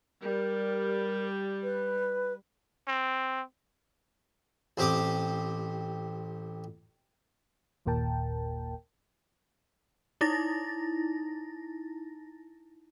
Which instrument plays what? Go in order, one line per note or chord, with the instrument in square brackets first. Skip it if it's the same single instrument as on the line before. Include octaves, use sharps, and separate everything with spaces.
[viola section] G3 [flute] A#4
[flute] B4
[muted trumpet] C4
[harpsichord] A1 C4 G4 D6 D#6
[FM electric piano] G1 D#2 A#2 A#4 G5 A5
[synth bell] D#4 E4 A6 A#6